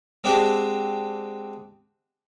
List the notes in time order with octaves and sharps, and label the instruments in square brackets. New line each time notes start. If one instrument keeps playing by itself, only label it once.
[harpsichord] G#3 C4 D4 F#4 G4